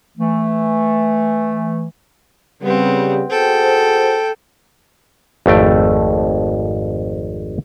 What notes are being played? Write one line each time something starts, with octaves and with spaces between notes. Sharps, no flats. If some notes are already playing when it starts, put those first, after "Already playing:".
E3 A3
C#3 G3 B3 C4
F#4 G#4 A4 C5 G5
G#1 F2 A3 G5